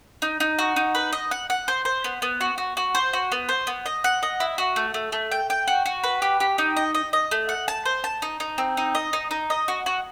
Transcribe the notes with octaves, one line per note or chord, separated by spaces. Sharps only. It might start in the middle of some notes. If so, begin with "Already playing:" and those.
D#4
D#4
F#4
D#4
B4
D#5
F#5
F#5
C5
C5
B3
B3
F#4
F#4
F#4
C5
F#4
B3
C5
B3
D#5
F#5
D#5
E4
F#4
A3
A3
A3
G5
G5
F#4
F#4
B4
G4
G4
D#4
D#5
D#5
D#5
A3
F#5
A5
C5
A5
D#4
D#4
C4
D#4
D#5
D#4
D#4
D#5
F#4
F#4